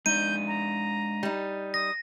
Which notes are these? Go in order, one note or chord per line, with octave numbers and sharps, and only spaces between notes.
G#3 D4 D#4 D5 G6 D#7
A#5
G3 D#4
D#6 A#6